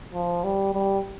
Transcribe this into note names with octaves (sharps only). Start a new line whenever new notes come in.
F3
G3
G3